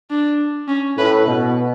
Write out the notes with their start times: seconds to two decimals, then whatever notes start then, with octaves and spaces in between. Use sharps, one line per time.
0.11 D4
0.68 C#4
0.98 A2 B4
1.27 B2